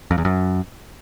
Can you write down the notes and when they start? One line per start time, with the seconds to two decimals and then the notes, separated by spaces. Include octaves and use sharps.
0.11 F2
0.18 E2
0.25 F#2